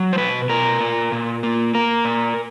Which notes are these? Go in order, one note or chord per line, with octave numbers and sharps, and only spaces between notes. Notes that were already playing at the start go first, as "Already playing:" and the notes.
Already playing: F#3
C5
B2 B4
B2 A#4
A#2
A#2
A#3
A#3 A#4
A#2